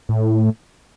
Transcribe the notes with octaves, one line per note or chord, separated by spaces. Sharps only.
A2